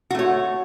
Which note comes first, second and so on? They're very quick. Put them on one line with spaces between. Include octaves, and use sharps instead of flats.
F#4 A3 C#5